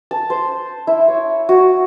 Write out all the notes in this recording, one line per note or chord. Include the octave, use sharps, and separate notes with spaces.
A5
C5
E4
C#5
F#4